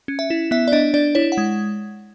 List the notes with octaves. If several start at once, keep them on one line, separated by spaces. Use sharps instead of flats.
C#4
E5
E4
B3 E5
D5
D4 D#5
D4 D5
E4 C#5
F#5
G#3